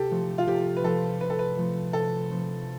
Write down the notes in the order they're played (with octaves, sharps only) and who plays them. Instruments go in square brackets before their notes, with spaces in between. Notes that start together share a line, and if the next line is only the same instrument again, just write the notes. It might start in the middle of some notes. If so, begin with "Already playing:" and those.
Already playing: [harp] C3 [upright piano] G4 A4
[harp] F3 A3 C4
[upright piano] F4
[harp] C3 [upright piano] G4
[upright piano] B4
[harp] F3 A3 C4 [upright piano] A4
[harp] C3 [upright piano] B4
[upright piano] A4
B4
[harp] F3 A3 C4
[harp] C3 [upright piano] A4
[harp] F3 A3 C4